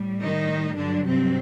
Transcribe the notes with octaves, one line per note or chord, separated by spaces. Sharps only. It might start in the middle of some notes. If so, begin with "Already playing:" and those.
Already playing: A2 G3
D#3 D#4
G2 D3 F#3 D4
C3 C4